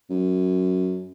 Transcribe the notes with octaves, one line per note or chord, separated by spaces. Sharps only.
F#2